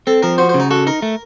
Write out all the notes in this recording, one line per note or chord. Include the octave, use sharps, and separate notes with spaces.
C4 A4
F3 A#4
F#4 C5
C5
C#3
D#4
F#4 A4
D#4 A#4
A3